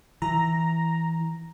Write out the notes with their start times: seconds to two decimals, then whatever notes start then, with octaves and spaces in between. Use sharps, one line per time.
0.22 E3 A#5